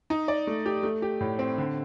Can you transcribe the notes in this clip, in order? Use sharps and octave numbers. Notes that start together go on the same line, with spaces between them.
D#4
D5
A3
G4
A3
G4
A2
C4
D3